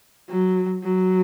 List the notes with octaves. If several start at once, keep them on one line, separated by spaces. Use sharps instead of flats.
F#3
F#3